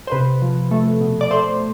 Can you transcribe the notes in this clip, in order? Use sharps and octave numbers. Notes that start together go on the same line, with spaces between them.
C5
C3 B4
F3
A3
B2
D5
A3 C5